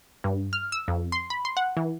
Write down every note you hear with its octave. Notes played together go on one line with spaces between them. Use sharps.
G2
F6
E6
F2
C6
B5
C6
F#5
E3